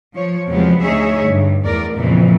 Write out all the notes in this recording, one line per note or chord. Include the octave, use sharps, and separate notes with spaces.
F3 C#5
E2 C3 F3 F#3 G#3 B3
D2 A3 D#4 G#4 C#5 E5
G2 D3
E2 A3 A#4 D5
F2 A#2 C#3 E3 F3